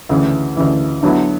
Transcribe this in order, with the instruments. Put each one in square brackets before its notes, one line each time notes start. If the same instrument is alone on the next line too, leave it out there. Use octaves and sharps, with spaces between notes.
[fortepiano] D2 C#3 E3
D2 C#3 E3
D3 F#3 B3 E4